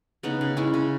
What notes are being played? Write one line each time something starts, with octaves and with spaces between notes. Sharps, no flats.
C#3 B3 D#4
C#3
G#3 C#4 E4
C#3